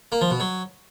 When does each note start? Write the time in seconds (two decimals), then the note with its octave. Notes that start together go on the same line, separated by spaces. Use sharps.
0.12 A#3
0.21 F3
0.31 B2
0.40 F#3